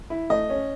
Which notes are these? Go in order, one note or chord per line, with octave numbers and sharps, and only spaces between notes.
E4
A3 D#5
C#4